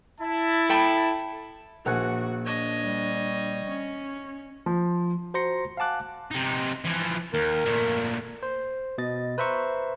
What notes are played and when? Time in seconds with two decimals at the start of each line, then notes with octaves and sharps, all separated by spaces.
0.20 E4 A5
0.70 A4 G5 B5
1.86 A#1 F#4 F#5 G#5
2.46 D4 C#5 D#5
2.82 G3
3.69 C#4
4.66 F3
5.34 F#4 C5 A#5 C6 A#6 C#7
5.77 F5 F#5 G#5 A5 D6 F#6
6.31 C3 D#4
6.85 E3 F3
7.34 D#2 A#4
7.65 A#2 A3
8.43 C5
8.98 B2 D#5 A6
9.38 B4 C5 E5 A#5 C#6